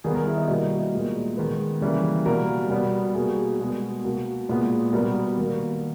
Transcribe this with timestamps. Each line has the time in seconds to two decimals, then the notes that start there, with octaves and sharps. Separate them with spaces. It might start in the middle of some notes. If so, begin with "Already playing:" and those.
0.04 D#3 G3 B3 G#4
0.15 A#4
0.26 E4
0.38 D#5
0.48 B2 G3 A#3 D#5
0.93 A#2 G#3 B3
1.37 D#3 G#3 B3 B4
1.81 C#3 E3 G3 A#3
2.26 B2 G3 A#3 A#4
2.70 B2 G3 B3
3.15 B2 G3 A#3 G#4
3.60 B2 G#3 B3
4.05 B2 A#3
4.49 A#2 G#3 B3
4.93 B2 G3 B3 A#4
5.37 D#3 A#3